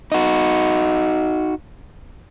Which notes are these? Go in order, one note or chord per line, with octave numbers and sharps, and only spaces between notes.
D#4 F#4